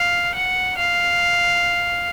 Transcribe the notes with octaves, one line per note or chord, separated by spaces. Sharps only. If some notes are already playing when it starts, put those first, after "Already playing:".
Already playing: F5
F#5
F5